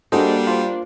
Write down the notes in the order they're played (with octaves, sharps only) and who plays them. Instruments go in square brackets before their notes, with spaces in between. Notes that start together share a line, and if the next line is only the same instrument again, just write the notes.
[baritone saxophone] G3 [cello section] A#3 D4 [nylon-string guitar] F#4 A4 [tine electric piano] G#4 C5 D#5
[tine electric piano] F4 C5